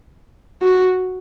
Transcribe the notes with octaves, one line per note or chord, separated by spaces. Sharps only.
F#4